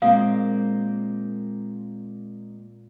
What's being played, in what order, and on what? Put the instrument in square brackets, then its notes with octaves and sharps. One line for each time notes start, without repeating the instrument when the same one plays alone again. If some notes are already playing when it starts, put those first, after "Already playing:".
[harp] A#2 [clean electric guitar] G#3 A#3 C4 [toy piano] F5 D#6